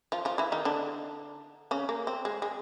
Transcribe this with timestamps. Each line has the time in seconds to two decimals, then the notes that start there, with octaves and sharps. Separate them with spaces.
0.12 F3 F4
0.25 F3 F4
0.38 E3 E4
0.52 D#3 D#4
0.65 D3 D4
1.71 C#3 C#4
1.89 A#3
2.07 C4
2.25 G#3
2.42 G#3